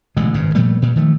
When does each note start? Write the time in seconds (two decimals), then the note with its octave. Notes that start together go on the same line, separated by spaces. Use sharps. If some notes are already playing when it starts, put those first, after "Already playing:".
0.17 A1 B2 D3 G#3
0.34 G#1 G2 C#3
0.55 A#2 F3 G3 A3
0.82 G2 A#2
0.96 D#3 F3 A3